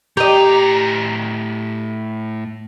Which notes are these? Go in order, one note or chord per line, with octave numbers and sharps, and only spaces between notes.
A2 G4 D#5 A#5